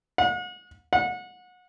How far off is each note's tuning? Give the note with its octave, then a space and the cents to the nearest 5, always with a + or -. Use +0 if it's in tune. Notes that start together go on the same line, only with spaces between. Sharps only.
F#5 -40
F#5 -30